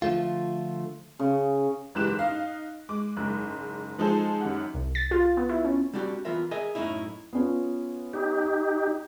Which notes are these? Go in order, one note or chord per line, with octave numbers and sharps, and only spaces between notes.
D3 F3 A3 F4
C#3
F#1 G#2 E3 G4 F#6 E7
D#4 D#5 F5
G#3 D6
F#1 G#2
F3 G#3 D#4 G#4 A4 C5
F#2 D#3 G4 F#5
C2
A6
F4
B3
E4
C#4
G3 C4 D4 F#4 G4
E3 B3 F4 A#4 E5
G#4 A#4 D#5 E5 G#5
F#2 A2 C#4 D#4 E4
B3 C#4 F4
D#4 G4